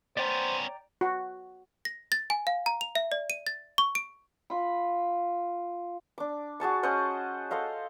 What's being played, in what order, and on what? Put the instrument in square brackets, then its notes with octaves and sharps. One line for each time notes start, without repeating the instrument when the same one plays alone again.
[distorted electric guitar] B3 C#4 [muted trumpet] C5 [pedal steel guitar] D5 G5 A#5
[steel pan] F#4
[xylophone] A#6
A6
G#5
F5
A#5
F7
E5
D5
D#7
A6
C#6
D7
[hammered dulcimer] F4 B5
[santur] D4 D6
F#4 G#4 A5 C#6
C#4 C5 D#5 F#5
A4 C5 D#5 F5